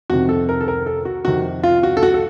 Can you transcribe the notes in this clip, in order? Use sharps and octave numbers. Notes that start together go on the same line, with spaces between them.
F2 C3 D#3 F#4
A4
A#4
A4
A#4
A4
F#4
F2 C3 D#3 F#4
F4
F#4
A4
F#4
A4